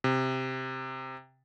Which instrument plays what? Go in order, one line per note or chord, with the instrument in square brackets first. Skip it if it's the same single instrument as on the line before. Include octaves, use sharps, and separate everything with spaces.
[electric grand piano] C3